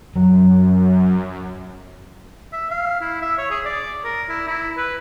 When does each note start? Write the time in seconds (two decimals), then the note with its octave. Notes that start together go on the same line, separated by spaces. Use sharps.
0.16 F#2 F#3
2.53 E5
2.70 F5
3.01 E4
3.22 E5
3.38 C#5
3.51 G#4
3.65 D5
4.04 A#4
4.29 E4
4.47 E4
4.77 B4